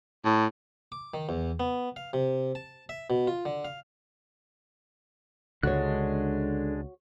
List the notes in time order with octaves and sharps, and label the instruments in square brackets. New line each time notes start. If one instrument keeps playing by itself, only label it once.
[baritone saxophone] A2
[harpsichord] D6
D#3
E2
B3
F5
C3
A5
E5
B2
F4
D3
F5
[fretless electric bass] C#2 [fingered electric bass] D3 [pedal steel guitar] G#3 D4 F#6 [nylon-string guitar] F#4 C#5